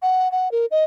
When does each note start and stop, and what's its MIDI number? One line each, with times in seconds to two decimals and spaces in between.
0.02 0.31 78
0.32 0.51 78
0.52 0.66 70
0.71 0.84 75